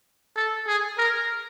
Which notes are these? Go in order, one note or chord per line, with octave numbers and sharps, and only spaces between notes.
A4
G#4
A#4